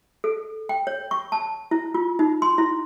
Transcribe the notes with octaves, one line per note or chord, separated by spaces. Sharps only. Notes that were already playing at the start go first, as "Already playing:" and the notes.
A4
G5
C#5
C#6
A5
E4
F4
D#4
C6
E4